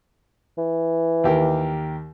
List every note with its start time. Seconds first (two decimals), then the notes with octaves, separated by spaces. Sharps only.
0.58 E3
1.24 D#2 G4 A#4